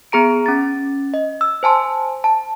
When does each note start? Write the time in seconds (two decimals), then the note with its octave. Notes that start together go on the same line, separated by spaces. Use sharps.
0.12 B3 G#4 A#5 D7
0.46 C#4 A6
1.14 D#5
1.41 E6
1.63 C5 G#5 A5 C6
2.24 A5